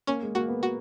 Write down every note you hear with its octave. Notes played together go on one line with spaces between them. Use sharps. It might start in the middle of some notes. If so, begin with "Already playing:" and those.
A#3 C#4
G#3
A#3 F#4
B3
F#4